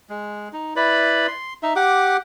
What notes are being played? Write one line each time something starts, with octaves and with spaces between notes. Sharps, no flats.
G#3
D#4
E4 B4 D5 B5
C6
D#4 E5
G4 F#5 D6